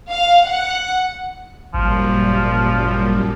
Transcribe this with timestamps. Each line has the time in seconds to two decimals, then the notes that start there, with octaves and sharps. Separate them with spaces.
0.10 F5
0.47 F#5
1.74 G#1 F#2 A#2 F3 G3